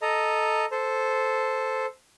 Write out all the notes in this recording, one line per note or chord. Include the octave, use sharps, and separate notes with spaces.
A4 D#5 A#5
A4 C5